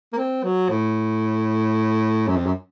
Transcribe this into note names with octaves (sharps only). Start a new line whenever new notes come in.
A#3
C4
F#3
A2
F#2
F2
F#2